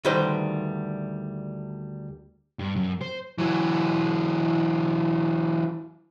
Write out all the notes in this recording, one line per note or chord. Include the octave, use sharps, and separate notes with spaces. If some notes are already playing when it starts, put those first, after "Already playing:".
D2 D#3 G3 B4 C5
G2
F#2
C5
E3 F#3